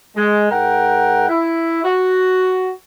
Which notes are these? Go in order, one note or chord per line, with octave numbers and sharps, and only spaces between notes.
G#3
G#2 A#4 F#5 G5
E4
F#4